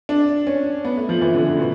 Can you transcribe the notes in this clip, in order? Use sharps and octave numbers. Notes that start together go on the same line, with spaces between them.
D4
C#4
B3
A3
F3
E3
D3
C#3
B2